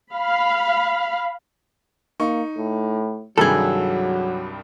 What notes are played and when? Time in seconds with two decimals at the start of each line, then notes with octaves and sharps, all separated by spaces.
0.14 F5 B5
2.20 A#3 D#4 C#6
2.58 A2
3.38 C2 G2 D#3 F#3 G#4 A4